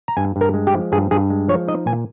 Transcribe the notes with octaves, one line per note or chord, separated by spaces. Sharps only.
A#5
G2 G#5
G2
A#4
G#3
G4
F3
G2 G#4
G2 G#4
G#3
F3 C#5
D#4 D#5
A#2 G#5